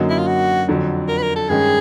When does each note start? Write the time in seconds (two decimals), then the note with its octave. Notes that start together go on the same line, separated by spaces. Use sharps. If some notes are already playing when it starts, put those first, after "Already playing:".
Already playing: F#2 D3 F#3 A#3 D#4
0.10 E4
0.18 F4
0.27 F#4
0.68 F2 D3 F#3
1.08 A#4
1.17 B4
1.22 A#4
1.36 A4
1.49 G2 D#3 G#3 C#4 G#4